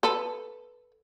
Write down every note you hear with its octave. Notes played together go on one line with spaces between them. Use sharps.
A4 B4